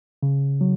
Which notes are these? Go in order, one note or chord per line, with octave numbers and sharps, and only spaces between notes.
C#3
F#3